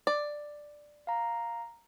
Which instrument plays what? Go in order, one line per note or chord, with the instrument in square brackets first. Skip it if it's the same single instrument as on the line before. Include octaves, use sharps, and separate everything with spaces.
[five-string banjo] D5
[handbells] F5 A#5